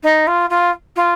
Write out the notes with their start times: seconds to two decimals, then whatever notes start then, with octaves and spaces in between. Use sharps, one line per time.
0.03 D#4
0.27 F4
0.50 F4
0.96 F4